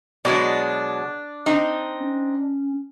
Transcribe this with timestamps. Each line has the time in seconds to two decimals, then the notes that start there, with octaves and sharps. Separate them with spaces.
0.25 B2 F#3 G#3 D4
1.46 C4 D#4
2.00 C#4